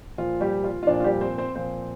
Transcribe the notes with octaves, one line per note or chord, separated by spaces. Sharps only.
A#2 F3 F4
G3 G4
F4
F4
A#2 F3 D4
F4
G3 G4
C4 C5
C4 C5
A#2 F3 C4 C5